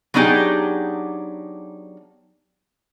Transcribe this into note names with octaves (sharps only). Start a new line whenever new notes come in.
F#3 B3 D4 D#4 G4 G#4